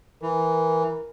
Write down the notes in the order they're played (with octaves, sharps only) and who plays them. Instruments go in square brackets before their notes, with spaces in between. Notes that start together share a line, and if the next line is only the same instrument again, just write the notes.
[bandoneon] E3 [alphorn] A#4